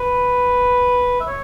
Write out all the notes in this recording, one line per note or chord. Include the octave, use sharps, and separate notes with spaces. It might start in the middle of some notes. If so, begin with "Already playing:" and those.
Already playing: B4
E5
C#5